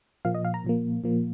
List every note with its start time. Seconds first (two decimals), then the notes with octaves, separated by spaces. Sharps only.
0.25 A#2 F3 A#3 F5
0.35 D#5
0.45 F5
0.54 A#5
0.64 A#2 F3 A#3
1.04 A#2 F3 A#3